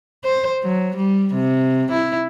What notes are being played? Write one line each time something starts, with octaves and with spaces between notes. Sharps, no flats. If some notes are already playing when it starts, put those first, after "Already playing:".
C5
F#3
G3
C3
E4